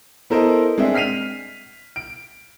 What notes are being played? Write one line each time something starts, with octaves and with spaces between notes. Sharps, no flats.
B3 E4 A4 A#4 C5 D#5
G#3 C4 D4 G#4 E5
F6 B6 C7 D#7 F7
D7